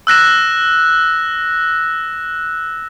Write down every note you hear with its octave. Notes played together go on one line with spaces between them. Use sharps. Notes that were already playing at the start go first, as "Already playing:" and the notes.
E6 F#6 A#6 E7